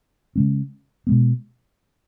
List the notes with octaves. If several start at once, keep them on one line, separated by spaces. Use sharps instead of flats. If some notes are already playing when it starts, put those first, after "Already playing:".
C#3 G#3 C#4
B2 G#3 B3